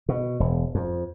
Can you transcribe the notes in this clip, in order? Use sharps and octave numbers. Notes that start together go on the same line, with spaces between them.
B2
E1
F2